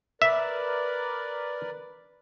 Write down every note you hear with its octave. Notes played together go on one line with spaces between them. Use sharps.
A#4 B4 D5 E5